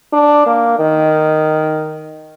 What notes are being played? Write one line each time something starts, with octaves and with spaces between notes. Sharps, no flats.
D4
A#3
D#3